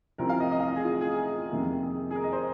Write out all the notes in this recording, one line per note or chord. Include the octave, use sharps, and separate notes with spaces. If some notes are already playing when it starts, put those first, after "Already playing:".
C2 C3 F3 C4 A#4
F5
D#5
D#5
F5
D#5
G#4
F4
G#4
G#4
F2 C3 D#3 A#3
G#4
G#4
A#4
D#5
C5